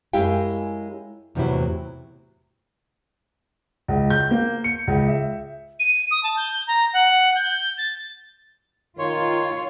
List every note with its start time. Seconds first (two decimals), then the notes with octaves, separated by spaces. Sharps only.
0.13 F#2 G#3 E4 G4 F5 G5
1.35 E2 A2 C3 F3 F#3 E4
3.88 C#2
4.10 G6
4.31 A#3
4.64 C#7
4.87 C#2
5.08 E5
5.79 D#7
6.10 D#6
6.23 A5
6.36 G6
6.67 A#5
6.93 F#5
7.35 G6
7.77 A6
8.99 D#3 F4 C#5 C6